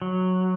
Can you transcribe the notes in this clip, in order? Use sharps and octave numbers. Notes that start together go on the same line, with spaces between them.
F#3